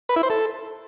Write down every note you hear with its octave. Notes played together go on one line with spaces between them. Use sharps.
B4
E4
C5
A4